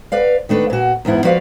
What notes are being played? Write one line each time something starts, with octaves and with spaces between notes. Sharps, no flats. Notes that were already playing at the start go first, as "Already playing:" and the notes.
B4 D5 F5
D#3 A3 D4 B4
A#2 F#4
E2 G#2 B3 E4
F3 F#4 B4 D5 F5